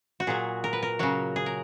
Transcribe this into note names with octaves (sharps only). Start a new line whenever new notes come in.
F#4
A#2 F#3 G#4
A#4
B4
A#4
C#3 F#3 F#4
G#4
A#4